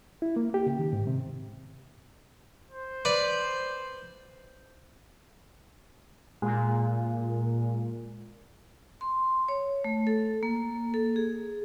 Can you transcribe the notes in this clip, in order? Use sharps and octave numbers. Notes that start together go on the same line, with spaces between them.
E4
A#3
G4
C#3
D#3
G#2
C3
C5
B4 D5
A#2 G#3
C6
C#5
A3
A4
A#3
A4
G#4